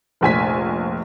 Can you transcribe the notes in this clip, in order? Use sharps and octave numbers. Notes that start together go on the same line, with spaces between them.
F1 A#1 G#5 B6